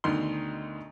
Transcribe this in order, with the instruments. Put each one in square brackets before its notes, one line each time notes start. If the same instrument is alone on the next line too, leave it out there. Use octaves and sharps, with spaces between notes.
[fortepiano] D2 B2 D#3 C6